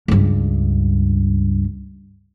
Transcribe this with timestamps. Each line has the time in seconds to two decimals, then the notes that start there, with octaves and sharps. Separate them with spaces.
0.08 C#2 G2